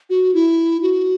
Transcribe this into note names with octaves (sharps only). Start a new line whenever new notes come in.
F#4
E4
F#4